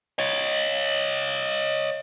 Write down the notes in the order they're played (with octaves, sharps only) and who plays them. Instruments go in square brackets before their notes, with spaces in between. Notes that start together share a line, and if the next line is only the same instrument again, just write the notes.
[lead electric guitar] C#5 D#5